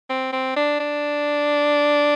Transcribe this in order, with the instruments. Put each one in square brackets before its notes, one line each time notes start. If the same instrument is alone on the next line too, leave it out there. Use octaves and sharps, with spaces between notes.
[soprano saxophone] C4
C4
D4
D4